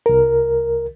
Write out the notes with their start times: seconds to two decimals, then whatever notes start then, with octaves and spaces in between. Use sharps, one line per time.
0.06 C2 A#4